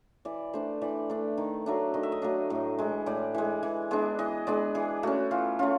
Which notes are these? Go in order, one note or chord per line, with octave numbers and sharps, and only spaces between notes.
E3 D5
A3 D4 C5
E3 D5
A3 D4
D#3
F#3 A3 D4
D#3 D#5
E5
D#5
F#3 A3 D4
A2
E3 G#3
A2 D5
E3 G#3
E3
G#3 B3 D4
E3 D#5
G#3 B3 D4 D5
E3 G#4
A3 C#4 F#4
E3 F4
A3 C#4 F4